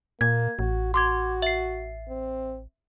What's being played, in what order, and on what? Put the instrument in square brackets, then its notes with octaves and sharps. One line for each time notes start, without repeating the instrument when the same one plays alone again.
[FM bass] A#2 [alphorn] A#3 [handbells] G#6
[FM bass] A1 [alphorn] F#4
[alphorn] F#4 [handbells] C6 D6 G#6
[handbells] E5 C7
[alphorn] C4